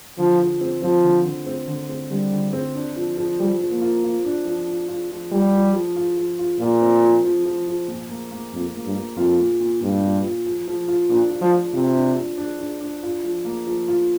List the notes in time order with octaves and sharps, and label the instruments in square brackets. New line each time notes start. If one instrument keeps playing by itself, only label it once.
[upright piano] D3 [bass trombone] F3
[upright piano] F3
C4
[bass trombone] F3 [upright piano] C4
[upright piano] D3
D3
C4
D3
C4
[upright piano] D3 [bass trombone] G3
[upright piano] D3
C4
D4
F3
F3
[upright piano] F3 [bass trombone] G3
[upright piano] F3
[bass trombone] A#3
[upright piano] F4
F4
D4
F3
F4
F4
F3
[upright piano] F3 [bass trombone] G3
[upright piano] F3
F3
F4
F3
F4
[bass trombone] A#2 [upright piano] F4
[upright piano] C4
F3
F3
F3
F3
A#2
A#3
A#3
[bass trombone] F2 [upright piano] A#3
[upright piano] A#3
[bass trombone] G2
[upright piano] A#3
[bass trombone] F2 [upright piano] F4
[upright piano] A#2
A#2
[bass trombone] G2 [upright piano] A#2
[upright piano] A#2
F4
F3
F3
F4
[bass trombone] A#2 [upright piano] D4
[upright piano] F4
[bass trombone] F3
[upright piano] F3
[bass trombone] C3 [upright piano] F4
[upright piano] D4
D4
D4
D4
D4
F4
F3
A#3
F3
F4